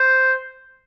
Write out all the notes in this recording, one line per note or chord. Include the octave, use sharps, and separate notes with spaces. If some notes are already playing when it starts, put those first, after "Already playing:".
Already playing: C5